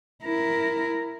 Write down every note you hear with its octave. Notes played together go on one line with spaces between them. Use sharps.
E4 A#4